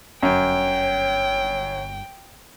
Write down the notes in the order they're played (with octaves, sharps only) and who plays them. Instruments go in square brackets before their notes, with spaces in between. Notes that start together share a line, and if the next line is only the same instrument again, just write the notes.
[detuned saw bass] G1 [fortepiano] F#2 [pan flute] C#5 [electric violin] G5